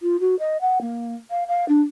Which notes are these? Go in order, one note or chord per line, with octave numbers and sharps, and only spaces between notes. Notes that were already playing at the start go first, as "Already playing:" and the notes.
F4
F#4
D#5
F#5
A#3
F5
F5
D4